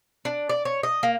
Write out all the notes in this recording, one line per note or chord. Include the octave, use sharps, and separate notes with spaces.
D4
D5
C#5
D#5
A#3